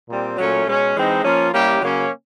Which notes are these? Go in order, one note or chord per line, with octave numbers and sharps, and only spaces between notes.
A#2 G3 C4
A#2 F#3 A3 C#4
B2 G#3 C#4
E3 G#3 C4 D#4
F3 A#3 C#4 F4
G3 A#3 C#4 E4 G4
C#3 F#3 A#3 C#4